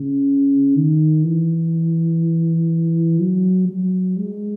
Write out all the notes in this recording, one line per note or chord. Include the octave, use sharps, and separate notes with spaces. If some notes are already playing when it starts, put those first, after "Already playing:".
Already playing: C#3
D#3
E3
F#3
F#3
G#3